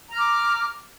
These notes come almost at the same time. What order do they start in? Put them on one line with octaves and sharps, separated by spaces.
A#5 F6 D6